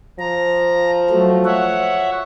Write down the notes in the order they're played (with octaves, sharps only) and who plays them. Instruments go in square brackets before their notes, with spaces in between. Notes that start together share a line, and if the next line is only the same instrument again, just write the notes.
[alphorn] F3 [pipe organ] A#5
[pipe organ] F#3 A3
C#5 E5 F#5